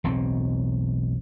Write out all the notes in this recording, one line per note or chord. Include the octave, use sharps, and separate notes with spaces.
E1 B1 A2 C4